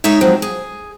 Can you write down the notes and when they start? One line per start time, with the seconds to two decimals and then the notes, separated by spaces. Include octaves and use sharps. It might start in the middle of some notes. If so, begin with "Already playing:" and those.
0.04 G#3 D#4 G#4 C#5 E5
0.21 F3 F#3 G#3 C4
0.42 G#4